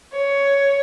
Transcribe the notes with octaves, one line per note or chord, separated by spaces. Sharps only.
C#5